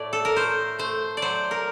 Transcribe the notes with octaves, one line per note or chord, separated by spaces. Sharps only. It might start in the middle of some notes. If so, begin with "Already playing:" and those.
Already playing: A2 A3 D5
A4
A#4
A3 C5
A3 C5
D5
F#3 C5
A#4